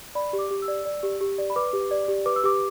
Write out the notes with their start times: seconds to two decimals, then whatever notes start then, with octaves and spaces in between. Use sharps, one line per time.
0.15 D5 B5
0.33 G4
0.39 D6
0.51 G4
0.62 E6
0.68 D5
0.85 D5
1.03 G4
1.21 G4
1.38 D5
1.50 B5
1.56 B4 D6
1.73 G4
1.91 D5
2.08 G4
2.26 B4 D6
2.36 E6
2.44 G4 D6